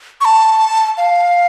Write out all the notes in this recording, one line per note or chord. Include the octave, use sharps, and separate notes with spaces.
C#6
A5
F5